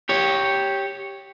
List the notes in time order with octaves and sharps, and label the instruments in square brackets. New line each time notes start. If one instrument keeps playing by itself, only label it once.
[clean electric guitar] G4 C#5